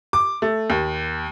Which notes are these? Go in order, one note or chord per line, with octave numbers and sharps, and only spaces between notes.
D6
A3
D#2